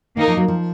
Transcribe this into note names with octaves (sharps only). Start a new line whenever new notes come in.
D#3 A#3 D#4 A#4
F3
F#3
F3